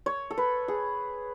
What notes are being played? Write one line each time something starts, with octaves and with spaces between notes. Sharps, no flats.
C#5
A4
B4
G#4